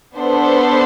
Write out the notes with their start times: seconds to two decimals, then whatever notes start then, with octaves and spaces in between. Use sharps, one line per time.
0.16 B3 D4 A4 C5